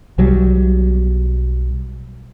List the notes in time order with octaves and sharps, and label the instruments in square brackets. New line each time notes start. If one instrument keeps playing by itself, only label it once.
[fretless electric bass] B1 F#3 G3